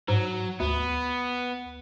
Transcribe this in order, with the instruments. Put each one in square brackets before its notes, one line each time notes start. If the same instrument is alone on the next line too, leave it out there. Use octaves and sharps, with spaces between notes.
[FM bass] G#2 [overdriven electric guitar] F#3
[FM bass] D2 [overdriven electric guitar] B3